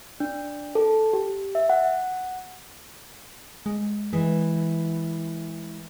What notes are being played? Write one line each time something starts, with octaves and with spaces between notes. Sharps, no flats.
D4
A4
G4
E5
F#5
G#3
E3 G#3